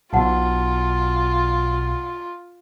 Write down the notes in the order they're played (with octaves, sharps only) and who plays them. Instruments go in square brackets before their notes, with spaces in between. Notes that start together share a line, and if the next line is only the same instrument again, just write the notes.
[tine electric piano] B1 B2 [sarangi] F4 [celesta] F#5 A5